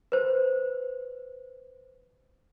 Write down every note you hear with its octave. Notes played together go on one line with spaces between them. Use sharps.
B4 C5